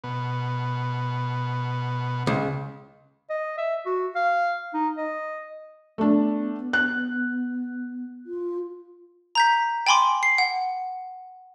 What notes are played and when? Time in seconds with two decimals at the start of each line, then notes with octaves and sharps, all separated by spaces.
0.04 B2
2.27 C#2
3.30 D#5
3.57 E5
3.86 F#4
4.15 F5
4.73 D#4
4.97 D#5
5.98 A3 B3 D4
6.73 F#6
8.26 F4
9.35 A#5 G6 B6
9.87 G5 G#5 B5 C6 D6
10.23 C7
10.38 F#5